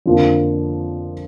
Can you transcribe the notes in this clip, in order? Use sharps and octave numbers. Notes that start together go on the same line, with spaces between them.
F2 D3 F3 A#3